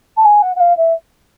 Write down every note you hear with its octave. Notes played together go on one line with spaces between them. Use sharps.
A5
G#5
F#5
F#5
F5
E5